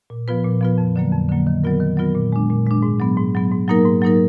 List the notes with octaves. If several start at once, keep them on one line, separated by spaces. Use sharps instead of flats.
A#2
F3 B3 F4 B4
A#2
F3 B3 F4 B4
F2
D3 F#3 A#3
F2
D3 F#3 A#3
D#3
F#3 B3 F4 A#4
D#3
F#3 B3 F4 A#4
A#2
G#3 D4
A#2
G#3 D4
G#2
F#3 B3
G#2
F#3 B3
G#2
F#3 A#3 D#4 A#4
G#2
F#3 A#3 D#4 A#4